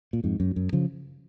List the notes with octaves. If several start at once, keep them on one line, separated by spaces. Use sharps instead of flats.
A#2
F2 G#2
F#2
F#2
C#3 F3